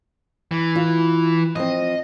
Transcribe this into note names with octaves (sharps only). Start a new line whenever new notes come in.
E3
F4
F3 C4 D#5